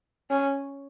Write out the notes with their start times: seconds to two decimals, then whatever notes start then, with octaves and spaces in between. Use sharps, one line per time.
0.30 C#4